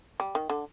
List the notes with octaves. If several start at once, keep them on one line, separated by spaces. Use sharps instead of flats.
G3
D#3
D3